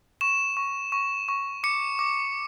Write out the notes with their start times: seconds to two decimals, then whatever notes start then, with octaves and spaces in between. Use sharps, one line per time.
0.21 C#6 E7
0.57 C#6
0.92 C#6
1.29 C#6
1.64 D6 C#7
1.99 D6